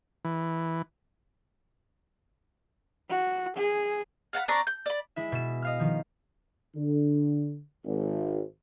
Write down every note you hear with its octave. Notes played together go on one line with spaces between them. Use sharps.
E3
F#4
G#4
F5 F#5 A5 B5
C4 D4 A#5 C#6
G6
D5 B5
G#3 E4 E5
B2 E7
D#5 F5 F6
D#3 F3
D3
G#1